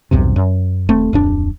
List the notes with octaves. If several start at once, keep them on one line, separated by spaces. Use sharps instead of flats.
B1 E2 G2 C3
F#2
D#1 A3 C4
D1 F2 D4